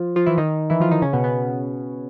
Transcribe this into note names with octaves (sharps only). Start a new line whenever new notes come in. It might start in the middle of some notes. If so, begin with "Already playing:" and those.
Already playing: F3 F4
F3 F4
E3 E4
D#3 D#4
E3 E4
F3 F4
D#3 D#4
C#3 C#4
B2 B3
B2 B3